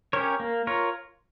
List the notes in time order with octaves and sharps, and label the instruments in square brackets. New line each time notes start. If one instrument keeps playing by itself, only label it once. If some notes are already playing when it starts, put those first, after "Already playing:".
[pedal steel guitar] C#4 G4 A#4 C#5
A#3
F4 A#4 C#5